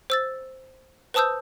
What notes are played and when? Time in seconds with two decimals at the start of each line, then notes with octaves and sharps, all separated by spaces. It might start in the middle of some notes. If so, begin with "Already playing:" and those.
0.10 C5 E6 A6
1.14 B4 C5 A5 D#6 E6 G6